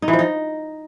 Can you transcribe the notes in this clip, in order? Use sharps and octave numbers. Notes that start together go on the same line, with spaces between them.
D#4
E3
F3
D#4